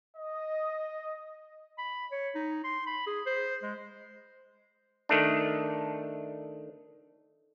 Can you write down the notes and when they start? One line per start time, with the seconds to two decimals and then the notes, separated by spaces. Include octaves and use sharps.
0.16 D#5
1.79 B5
2.12 C#5
2.35 D#4
2.64 C6
2.87 B5
3.07 G#4
3.27 C5
3.63 G#3
5.09 D#3 A3 D4